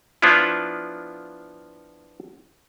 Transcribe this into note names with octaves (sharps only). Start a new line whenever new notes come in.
F3 B3 D4 E4 F4